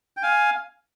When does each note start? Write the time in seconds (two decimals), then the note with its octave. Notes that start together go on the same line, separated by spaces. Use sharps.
0.17 G5
0.23 F5 G#5